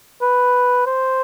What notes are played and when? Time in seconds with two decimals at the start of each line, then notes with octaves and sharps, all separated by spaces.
0.21 B4
0.86 C5